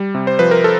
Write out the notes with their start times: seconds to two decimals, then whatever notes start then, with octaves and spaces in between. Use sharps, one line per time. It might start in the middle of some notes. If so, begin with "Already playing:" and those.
Already playing: G3
0.15 C3
0.27 C5
0.39 F3 B4
0.51 A#4
0.64 A4